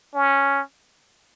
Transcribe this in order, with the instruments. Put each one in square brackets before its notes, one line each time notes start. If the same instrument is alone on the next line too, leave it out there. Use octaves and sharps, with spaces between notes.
[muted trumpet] C#4